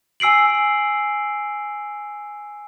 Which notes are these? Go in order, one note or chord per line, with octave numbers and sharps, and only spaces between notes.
G#5 E6 C7 D7 F#7